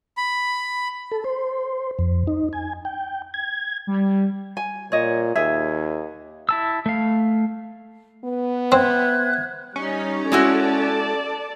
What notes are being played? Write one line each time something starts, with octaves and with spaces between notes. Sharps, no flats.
B5
A4
C5
F2
D#4
G#5
G5
G#6
G3
G#5
A#2 C#5 D#5
D#2 G#4 E5
E4 A5 E6
A3 F5
B3 B4
C4 E5 F#6 G#6
G3 C#4 D#4
G#3 E4 F#4 A4 D5 A5